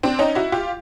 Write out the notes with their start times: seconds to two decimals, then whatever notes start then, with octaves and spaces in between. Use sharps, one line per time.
0.03 C4 D4
0.19 C#4 D#4
0.35 E4 F#4
0.52 F4 G4